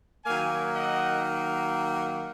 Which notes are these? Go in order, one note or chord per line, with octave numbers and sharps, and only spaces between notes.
D#3 F#3 A#3 F5 G#5
D#5 F#5